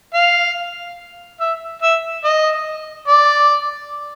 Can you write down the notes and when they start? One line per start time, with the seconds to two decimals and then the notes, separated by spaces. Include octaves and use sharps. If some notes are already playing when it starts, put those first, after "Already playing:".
0.14 F5
1.40 E5
1.82 E5
2.24 D#5
3.08 D5